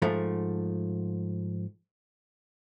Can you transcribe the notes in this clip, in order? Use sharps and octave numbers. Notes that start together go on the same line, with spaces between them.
G#2 F3 A3